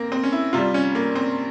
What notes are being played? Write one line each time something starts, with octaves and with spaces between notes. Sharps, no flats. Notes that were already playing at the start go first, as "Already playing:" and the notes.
Already playing: A#3 C4
C4
C#4
E4
C3 G3 F4
C#4
A#3
C4